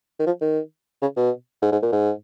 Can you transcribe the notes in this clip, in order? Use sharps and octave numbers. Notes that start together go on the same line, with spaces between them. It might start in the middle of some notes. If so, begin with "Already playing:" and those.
D#3
F3
D#3
C#3
B2
G#2
G#2
A#2
G#2